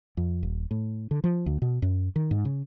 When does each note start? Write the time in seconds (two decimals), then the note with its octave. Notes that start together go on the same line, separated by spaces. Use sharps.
0.17 F2
0.43 D#1
0.71 A2
1.11 D3
1.24 F3
1.46 D2
1.62 B2
1.82 F#2
2.16 D#3
2.31 G#2
2.45 C#3